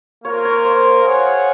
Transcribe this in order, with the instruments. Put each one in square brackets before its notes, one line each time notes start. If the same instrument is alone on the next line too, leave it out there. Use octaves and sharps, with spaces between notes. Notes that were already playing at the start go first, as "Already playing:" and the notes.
[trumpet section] A#3 F4 A#4 [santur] C#5
[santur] C#5
C5
[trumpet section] F4 G#4 C#5 F#5